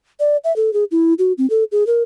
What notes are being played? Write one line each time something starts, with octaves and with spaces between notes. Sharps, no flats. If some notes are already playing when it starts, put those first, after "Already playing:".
D5
E5
A4
G#4
E4
F#4
C4
A4
G#4
A#4